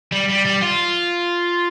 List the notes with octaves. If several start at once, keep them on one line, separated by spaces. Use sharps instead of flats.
G3
G3
G3
F4